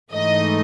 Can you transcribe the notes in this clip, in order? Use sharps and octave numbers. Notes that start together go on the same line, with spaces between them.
G#2 E3 A3 D#4 D#5